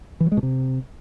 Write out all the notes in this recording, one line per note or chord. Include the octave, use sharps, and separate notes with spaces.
E3
F#3
G#3
B2
C3